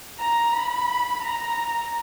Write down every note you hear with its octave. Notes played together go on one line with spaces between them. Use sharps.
A#5
B5
A#5